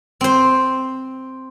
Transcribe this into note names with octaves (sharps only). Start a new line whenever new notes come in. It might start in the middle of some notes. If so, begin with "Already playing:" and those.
C4 C5